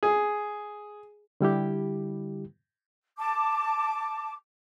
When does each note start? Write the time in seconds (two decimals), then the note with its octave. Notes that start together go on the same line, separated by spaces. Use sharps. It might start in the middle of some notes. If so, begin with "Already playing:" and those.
0.03 G#4
1.41 D3 G3 E4 G4
3.18 A5 D6